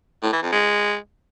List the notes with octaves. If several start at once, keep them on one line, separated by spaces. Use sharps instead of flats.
A2
E3
F2
G#3